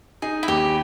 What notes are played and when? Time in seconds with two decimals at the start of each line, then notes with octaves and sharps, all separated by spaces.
0.22 D#4 G#4
0.43 E4
0.48 D#2 G4